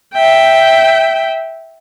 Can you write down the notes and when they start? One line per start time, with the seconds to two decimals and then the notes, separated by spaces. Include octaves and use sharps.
0.14 E5 G5